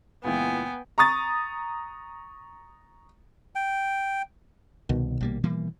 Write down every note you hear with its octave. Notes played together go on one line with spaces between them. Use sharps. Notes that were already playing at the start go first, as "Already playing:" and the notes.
C#2 A#2 E3 B3 G5 G#5
A#5 C#6 D#6 A6
G5
C2 B2 D#3
A#1 G3 A#3
E3 G3 A#3